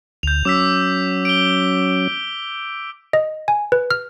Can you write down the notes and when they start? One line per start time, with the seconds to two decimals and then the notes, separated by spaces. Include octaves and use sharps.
0.23 D2 G6 F7
0.45 F#3 C#4 D6 E6 B6
1.25 D7 G7
3.13 D#5
3.48 G#5
3.72 B4
3.91 F6